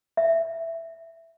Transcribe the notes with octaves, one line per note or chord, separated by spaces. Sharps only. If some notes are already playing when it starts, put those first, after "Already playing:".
E5